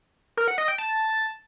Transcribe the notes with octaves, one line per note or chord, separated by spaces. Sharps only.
A#4
F#5
D#5
G5
A5